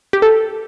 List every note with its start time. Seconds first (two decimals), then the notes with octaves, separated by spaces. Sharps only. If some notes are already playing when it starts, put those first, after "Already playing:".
0.13 G4
0.22 A4